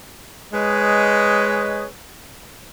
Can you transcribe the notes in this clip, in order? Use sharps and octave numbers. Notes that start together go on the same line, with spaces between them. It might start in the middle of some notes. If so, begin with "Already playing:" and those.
G#3 G#4 B4 C#5 D#5